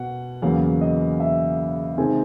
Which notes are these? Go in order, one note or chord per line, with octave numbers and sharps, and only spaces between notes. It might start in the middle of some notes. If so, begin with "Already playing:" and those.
Already playing: B2 F#5
E2 C#3 F#3 A#3 F5
D#5
E5
C3 D#3 G#3 C4 G#5